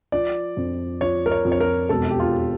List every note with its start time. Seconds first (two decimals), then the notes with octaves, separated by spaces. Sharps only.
0.12 F3 D5
0.57 F2
1.01 F3 C#5
1.26 A#4
1.32 C#5
1.45 F2
1.52 C#5
1.60 A#4
1.89 E1 A4
2.11 G4
2.19 F4